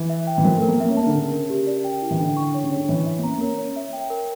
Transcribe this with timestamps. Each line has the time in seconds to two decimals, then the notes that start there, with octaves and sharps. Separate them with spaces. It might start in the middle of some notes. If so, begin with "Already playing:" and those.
Already playing: E3
0.09 E5
0.27 G5
0.38 E3
0.44 F3 A#4
0.57 A3
0.62 A#4
0.68 A#3
0.80 A#3 E5
0.88 C#4
0.97 A#3 A5
1.06 D3
1.14 C#3 A#4
1.32 A#4
1.50 G4
1.67 D5
1.84 G5
2.02 E4
2.11 E3
2.19 D3 G5
2.37 C#6
2.54 C#5
2.63 C#3
2.71 C#5
2.76 D3
2.89 E3 C#5
3.06 E5
3.18 A#3
3.23 C#4 A#5
3.38 A#3
3.41 C#4 A#4
3.58 C#5
3.76 E5
3.93 G5
4.10 A#4